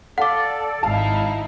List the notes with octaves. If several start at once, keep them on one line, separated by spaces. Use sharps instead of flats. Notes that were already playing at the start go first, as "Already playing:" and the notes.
A4 D5 F5 F#5 D6
G#1 D#4 E4 F5 A5